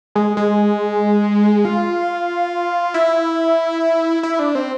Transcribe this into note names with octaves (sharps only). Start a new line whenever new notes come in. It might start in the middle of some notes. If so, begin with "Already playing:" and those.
G#3
G#3
F4
E4
E4
D4
C4